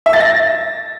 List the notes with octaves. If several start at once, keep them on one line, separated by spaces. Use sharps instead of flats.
E5
A6
A#6